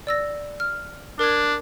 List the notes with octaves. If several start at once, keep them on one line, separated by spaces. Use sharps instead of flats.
D5 E6 A#6
F6
D4 A#4 G#6